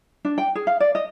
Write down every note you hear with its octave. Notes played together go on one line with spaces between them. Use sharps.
D4
G5
G#4
F5
D5
D#5